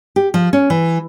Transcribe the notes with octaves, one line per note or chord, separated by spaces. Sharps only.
G4
F3
C#4
E3